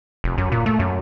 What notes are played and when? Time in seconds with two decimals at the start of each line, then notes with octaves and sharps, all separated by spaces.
0.24 F1
0.38 F#2
0.52 A#2
0.66 A3
0.79 F#2